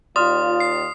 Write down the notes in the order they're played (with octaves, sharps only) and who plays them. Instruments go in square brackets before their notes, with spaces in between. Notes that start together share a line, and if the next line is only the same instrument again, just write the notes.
[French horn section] D#2 F4 [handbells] D5 [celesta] C6 F6 [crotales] D#6
[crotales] C7